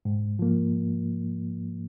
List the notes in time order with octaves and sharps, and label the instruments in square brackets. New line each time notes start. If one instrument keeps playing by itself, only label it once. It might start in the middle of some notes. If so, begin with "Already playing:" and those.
[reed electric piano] G#2
F3 A#3